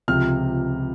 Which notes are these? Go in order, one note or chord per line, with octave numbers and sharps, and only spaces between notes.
C#2 C3 F3 F6